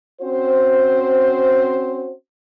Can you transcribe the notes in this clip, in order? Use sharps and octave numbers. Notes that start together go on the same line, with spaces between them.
C4 C#4 F#4 C5